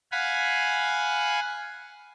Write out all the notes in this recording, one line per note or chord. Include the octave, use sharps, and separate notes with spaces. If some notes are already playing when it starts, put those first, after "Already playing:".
F5 F#5 G#5 B5